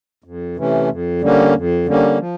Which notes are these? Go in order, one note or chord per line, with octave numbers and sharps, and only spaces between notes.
F2
C3 E3 A3 C#4
F2
D3 G3 A#3 C#4
F2
D3 G3 A#3 C#4
F3